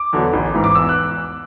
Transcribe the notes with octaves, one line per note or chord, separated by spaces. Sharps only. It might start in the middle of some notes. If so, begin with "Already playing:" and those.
Already playing: D6
E2 D3 F#3
A1
G#2 E3
D6
E2 E6
F#6